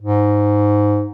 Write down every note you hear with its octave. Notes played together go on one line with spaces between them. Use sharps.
G#2